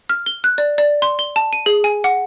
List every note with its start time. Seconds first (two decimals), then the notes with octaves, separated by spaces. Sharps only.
0.09 F6
0.26 G7
0.44 F#6
0.58 D5
0.78 D5
1.02 C6
1.19 G7
1.36 A5
1.53 D#7
1.66 G#4
1.84 G#5
2.04 F#5